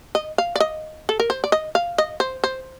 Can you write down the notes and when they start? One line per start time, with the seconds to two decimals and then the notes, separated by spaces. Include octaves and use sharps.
0.15 D#5
0.38 F5
0.56 D5
0.60 D#5
1.09 A4
1.20 A#4
1.30 C5
1.44 D5
1.52 D#5
1.75 F5
1.98 D#5
2.20 C5
2.44 C5